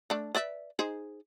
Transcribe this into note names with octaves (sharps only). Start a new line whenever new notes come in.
A3 D4
B4 D5 E5
D#4 G#4 C5